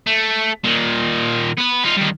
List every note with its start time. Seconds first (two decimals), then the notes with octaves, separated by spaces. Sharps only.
0.07 A3
0.64 A#2 D#3
1.58 B3 B4
1.85 D#4 F4
1.97 G2 D#3